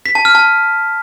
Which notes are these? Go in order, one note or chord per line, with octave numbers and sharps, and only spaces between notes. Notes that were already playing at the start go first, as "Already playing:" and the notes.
B6
A5
F6
A5